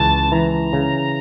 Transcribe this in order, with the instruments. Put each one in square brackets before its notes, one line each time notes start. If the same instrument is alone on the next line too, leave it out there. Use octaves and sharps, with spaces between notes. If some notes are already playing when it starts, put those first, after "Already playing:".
Already playing: [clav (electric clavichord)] C#2 E3 [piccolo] A5
[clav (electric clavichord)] E3 [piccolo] A#5
[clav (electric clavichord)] C#3